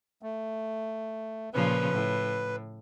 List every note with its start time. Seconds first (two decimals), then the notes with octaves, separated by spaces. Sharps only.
0.22 A3
1.54 A#2 C#3 F3 B4
1.92 A2